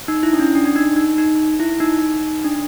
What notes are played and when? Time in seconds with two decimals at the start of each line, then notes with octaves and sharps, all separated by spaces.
0.08 D#4
0.23 E4
0.33 D4
0.40 C#4
0.55 D4
0.65 D4
0.76 D#4
0.96 D#4
1.18 D#4
1.60 E4
1.80 D#4
2.44 D4